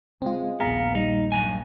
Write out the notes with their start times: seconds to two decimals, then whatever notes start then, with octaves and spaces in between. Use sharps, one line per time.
0.22 C#3 G#3 C4 F4
0.60 A#1 D#2 A#2 B3 G#4 F5 A#5
0.95 G3 D#4
1.32 G2 F#3 G#5